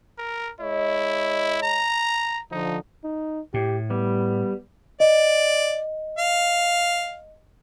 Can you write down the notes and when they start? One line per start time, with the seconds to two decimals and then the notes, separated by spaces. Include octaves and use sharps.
0.19 A#4
0.60 G#3 E4 C#5 D#5
1.63 A#5
2.52 D3 F3 D#4
3.04 D#4
3.54 A2 G4
3.90 G3 B3
5.00 D5 D#5
6.18 F5